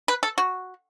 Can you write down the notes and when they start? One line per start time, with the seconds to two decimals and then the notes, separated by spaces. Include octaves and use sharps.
0.08 B4
0.23 A4
0.38 F#4